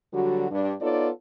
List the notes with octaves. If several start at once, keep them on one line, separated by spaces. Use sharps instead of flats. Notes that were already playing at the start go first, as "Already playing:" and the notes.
D3 F#3 G3 F#4
G2 D4
B3 D#4 F4 A4 C#5 D5